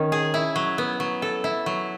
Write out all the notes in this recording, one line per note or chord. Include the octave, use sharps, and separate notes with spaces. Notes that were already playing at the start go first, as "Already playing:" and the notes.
Already playing: D#3 C#4
G#4
E4
F#3
B3
F#3
A4
E4
F#3